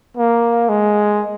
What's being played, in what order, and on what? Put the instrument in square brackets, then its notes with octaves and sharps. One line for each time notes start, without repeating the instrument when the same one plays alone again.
[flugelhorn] A#3
G#3